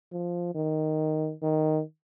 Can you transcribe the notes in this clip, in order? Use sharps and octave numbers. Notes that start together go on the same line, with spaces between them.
F3
D#3
D#3